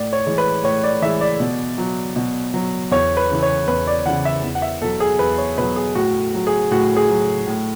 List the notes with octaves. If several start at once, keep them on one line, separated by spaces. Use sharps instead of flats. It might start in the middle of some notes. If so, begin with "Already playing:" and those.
Already playing: A2 D5
C#5
E3 G#3
B4
A2 C#5
D5
E3 G#3 E5
D5
B2
F#3
B2
F#3
E2 C#5
B4
C#3 E3
C#5
E2 B4
D5
C#3 E3 F#5
E5
E2
F#5
E5
B2 F#3 A4
G#4
E2 B4
C#5
B2 F#3 B4
G#4
A2 F#4
F#3
G#4
A2 F#4
G#4
F#3
A2